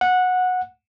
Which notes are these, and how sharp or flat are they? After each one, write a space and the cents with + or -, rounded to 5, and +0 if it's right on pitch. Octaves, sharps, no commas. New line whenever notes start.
F#5 -15